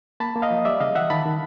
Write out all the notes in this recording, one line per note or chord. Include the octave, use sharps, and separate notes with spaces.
A#3 A5 B5
A#3
D#5 F5
F3
G3 D5 E5
C#3 D#5 F5
E3 E5 F#5
D#3 A5 B5
D#3